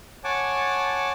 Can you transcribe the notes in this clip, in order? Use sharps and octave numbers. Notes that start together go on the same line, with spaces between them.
C#5 F#5 G#5 A5 D6